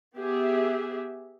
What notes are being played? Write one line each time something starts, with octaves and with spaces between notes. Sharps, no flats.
B3 G4 G#4 E5